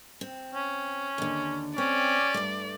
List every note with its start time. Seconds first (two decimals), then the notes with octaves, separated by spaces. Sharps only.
0.21 C4
0.55 C#4
1.18 D#2 D3
1.78 C4 C#4 D5
2.34 G2 A3